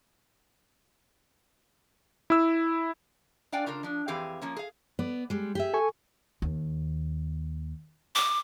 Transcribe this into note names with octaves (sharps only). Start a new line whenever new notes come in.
E4 E6
D4 D5 F5 G5 G#5
C#3 D4 F4 A#4
F3 D4
F2 E3 C4 G4 G#4 F5
F3 A#3 C#4
G#4 F5
B3 D5
G3 G#3
G4 G#4 E5
A4 G#5 C#6
D#2
D6